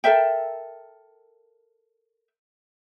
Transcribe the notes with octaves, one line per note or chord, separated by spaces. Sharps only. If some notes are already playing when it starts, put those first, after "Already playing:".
A4 A#4 E5 G5